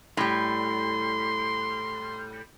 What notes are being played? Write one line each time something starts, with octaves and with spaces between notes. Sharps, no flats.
A2 G3 C6